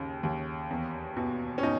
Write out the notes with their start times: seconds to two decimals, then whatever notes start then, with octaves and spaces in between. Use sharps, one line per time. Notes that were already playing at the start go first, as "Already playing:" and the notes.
Already playing: D#2 C#3 C#4
0.23 D#2
0.70 E2
1.17 B2
1.58 C#4
1.63 B2 D#4